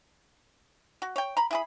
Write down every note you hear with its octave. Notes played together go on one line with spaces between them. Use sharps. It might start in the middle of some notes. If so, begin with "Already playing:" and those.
F#4
C#5 G5
A#5 B5
E4 G#4 B5